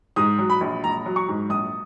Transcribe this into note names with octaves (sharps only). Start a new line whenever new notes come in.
G#2 D#6
F#3
B5
A#1
A#1 A#5
F#3
C#6
G#2
A#1 D#6